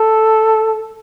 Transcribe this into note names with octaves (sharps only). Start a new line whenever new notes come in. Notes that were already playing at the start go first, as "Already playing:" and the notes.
Already playing: A4